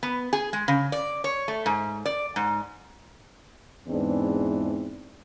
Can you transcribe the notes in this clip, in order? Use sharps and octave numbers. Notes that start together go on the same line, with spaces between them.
B3
G#4
G#3
C#3
D5
C#5
A3
G#2
D5
G#2
E2 G#2 E3 G#3 C4 D4